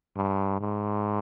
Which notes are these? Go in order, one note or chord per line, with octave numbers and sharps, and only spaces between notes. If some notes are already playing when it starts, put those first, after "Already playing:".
G2
G#2